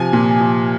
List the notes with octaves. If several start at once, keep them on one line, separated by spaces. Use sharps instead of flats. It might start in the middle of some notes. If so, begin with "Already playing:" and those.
Already playing: C3 F3 G#5
A#2
F3